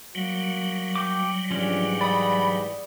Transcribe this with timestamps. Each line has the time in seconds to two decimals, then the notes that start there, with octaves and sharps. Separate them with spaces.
0.15 F#3 G3 A#3 F#4
0.95 G5 D6
1.51 G#2 E3 F3 C#4 D4 G4
2.01 D5 F#5 B5 D#6